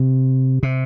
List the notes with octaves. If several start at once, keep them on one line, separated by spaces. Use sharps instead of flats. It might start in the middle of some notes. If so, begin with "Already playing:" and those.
Already playing: C3
C3